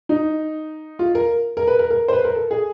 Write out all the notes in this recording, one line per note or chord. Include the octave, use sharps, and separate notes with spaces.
D#4
F4
A#4
A#4
B4
A#4
A#4
C5
B4
A#4
A4
G#4